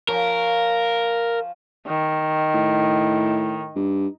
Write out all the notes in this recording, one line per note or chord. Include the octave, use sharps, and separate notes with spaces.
F3 C#4 A#4
D#3
A2
G2